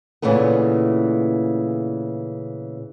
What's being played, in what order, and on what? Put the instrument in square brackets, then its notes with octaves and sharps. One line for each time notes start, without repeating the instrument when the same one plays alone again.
[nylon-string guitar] A#2 C#3 E3 A3 B3